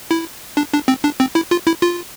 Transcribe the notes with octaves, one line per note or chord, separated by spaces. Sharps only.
E4
D4
D4
C4
D4
C4
E4
F4
E4
F4